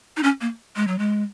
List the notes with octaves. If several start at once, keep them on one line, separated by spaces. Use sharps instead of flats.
D#4
C#4
A#3
G#3
F#3
G#3